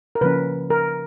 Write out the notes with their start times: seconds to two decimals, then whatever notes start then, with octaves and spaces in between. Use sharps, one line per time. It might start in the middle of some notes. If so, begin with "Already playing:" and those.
0.15 A#4
0.21 C#3 F3 A#3 C#4 B4
0.70 A#4